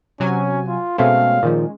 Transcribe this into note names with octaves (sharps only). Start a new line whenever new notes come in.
C3 F#3 C#4 G#5
F4
B2 G#3 A3 C4 C#4 F5
A#2 D#3 F3